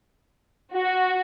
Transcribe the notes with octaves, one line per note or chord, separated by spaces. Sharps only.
F#4